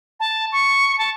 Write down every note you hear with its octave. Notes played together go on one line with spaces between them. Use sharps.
A5
C#6
A5